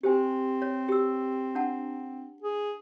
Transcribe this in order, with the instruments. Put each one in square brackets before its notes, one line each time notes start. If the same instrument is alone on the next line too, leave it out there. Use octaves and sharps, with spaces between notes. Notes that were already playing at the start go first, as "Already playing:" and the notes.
[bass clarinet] C4 [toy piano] G4 C5 G#5
[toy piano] C#5
G4 E6
D4 F#5 A5
[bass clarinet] G#4